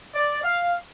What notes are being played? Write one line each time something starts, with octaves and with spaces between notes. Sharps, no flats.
D5
F5